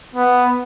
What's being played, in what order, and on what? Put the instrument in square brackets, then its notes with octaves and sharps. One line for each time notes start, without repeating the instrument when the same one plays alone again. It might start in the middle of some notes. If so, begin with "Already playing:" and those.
[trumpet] B3